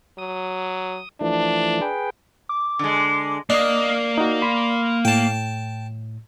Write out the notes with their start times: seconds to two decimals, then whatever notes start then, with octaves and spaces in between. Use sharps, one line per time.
0.18 F#3 D#6
1.21 E3 F3 A3 D4
1.81 G#4 B4 G5
2.49 D6
2.79 D3 G#3
3.50 A#3 D4 D#5 D#6
4.18 D#4 F#4
4.42 B5 C6
5.05 A2 G5 A5